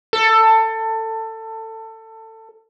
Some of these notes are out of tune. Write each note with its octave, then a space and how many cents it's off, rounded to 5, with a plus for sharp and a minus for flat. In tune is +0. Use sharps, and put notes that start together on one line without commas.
A4 +20